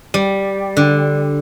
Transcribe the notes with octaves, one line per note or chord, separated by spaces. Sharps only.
G3
D3